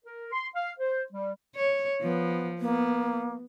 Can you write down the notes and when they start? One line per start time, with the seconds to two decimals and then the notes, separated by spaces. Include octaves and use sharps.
0.05 A#4
0.32 C6
0.55 F5
0.79 C5
1.12 G3
1.56 C#5
2.01 F3 B3
2.61 A#3 B3